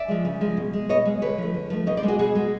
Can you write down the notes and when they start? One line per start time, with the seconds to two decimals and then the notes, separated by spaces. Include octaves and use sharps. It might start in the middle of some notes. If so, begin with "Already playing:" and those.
Already playing: D5 E5
0.08 F3 G#3
0.25 C#3
0.41 F3 G#3
0.57 B2
0.73 G#3
0.89 B2 C#5 D#5
1.05 G#3
1.22 D3 B4 C#5
1.38 F3 A3
1.54 D3
1.70 F3 A3
1.86 B2 C#5 D#5
1.97 C5 D5
2.03 G#3
2.08 F#4 G#4
2.19 B2 F#4 G#4
2.35 G#3